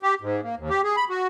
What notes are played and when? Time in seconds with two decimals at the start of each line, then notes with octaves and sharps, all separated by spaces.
0.03 G4
0.22 G#2
0.43 A#3
0.57 D#2
0.70 G4
0.83 G#4
0.97 B5
1.09 F#4